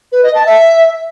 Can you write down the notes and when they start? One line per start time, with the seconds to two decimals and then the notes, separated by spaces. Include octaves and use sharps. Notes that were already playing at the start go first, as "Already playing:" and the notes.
0.12 B4
0.23 D#5
0.35 A5
0.46 E5